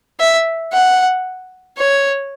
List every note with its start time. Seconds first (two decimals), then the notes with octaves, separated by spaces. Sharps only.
0.20 E5
0.73 F#5
1.78 C#5